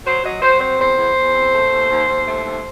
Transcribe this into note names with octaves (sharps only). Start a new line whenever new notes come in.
F#3 C5
F#3 D#5
F#3 C5
C4 C5
E2 C5
E2
E2
C4
A3
D#2
D#2
D#2
A3
D#2